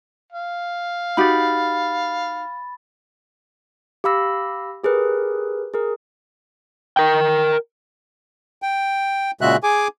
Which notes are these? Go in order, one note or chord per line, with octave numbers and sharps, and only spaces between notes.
F5
D#4 F#4 G4 B5 A6
G4 F5 B5 E6 A#6
G4 G#4 A#4 B4
G#4 A#4
A#4 G5
G5
A#2 C#3 G#3 F#4 E5 F#6
G#4 G#5 D6